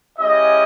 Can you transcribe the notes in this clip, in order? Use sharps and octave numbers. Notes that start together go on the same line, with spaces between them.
G#3 C#4 E4 G4 D#5